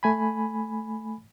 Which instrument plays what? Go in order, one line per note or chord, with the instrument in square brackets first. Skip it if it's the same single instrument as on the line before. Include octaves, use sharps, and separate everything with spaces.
[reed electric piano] A3 G#5 B5